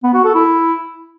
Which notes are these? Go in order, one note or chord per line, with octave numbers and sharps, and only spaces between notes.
B3
F#4
A4
E4